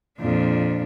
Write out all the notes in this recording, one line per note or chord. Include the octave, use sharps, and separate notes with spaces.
F2 A#2 D4